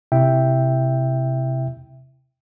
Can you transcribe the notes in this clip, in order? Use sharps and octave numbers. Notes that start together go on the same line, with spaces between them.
C3 E4 E5 G5